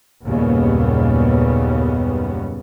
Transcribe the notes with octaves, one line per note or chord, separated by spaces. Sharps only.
F#1 D#2 A#2 C#3 G3 B3